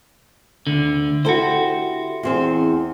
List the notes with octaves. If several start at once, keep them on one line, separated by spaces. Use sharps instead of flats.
D2 D3
E4 F#4 G4 A4 C5
E2 C4 G#4